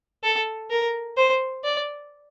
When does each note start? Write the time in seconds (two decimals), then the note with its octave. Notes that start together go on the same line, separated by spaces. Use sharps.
0.24 A4
0.70 A#4
1.17 C5
1.64 D5